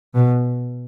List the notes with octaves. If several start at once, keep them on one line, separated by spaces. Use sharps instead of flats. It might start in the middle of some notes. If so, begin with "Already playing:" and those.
B2